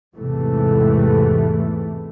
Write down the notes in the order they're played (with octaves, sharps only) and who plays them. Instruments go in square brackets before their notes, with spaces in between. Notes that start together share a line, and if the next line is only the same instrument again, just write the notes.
[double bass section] E2 G#2 C3 E3 A3